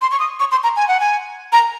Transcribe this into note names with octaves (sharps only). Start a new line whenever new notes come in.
C6
C#6
D#6
C#6
C6
A#5
G#5
F#5
G#5
A#5